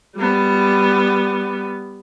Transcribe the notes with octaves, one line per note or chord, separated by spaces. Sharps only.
G3 B3